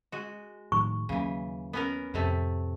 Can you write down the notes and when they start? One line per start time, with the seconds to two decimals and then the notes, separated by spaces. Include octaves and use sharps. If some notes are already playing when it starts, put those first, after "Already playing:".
0.12 G#3 F#4
0.72 A2 D#3 C#6
1.09 D#2 C#3 E3 F#3 A#3
1.73 B3 C#4 A#4
2.14 F2 A2 C3 A3